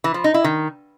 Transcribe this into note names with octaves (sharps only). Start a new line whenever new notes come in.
E3
F3
D#4
E4
D#3